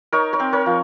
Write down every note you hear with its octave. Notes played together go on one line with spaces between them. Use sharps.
D#4 A#4 C#5
A#4 C#5
C4
A#4 C#5
F3